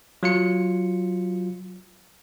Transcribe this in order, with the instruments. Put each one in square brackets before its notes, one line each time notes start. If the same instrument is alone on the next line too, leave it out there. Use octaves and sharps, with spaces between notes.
[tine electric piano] F#3 F4 C#7